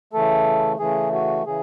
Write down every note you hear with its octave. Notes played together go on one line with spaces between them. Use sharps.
C#3 E3 A3 A4
C#3 E3 A3 G#4
F#4
C#3 E3 G#4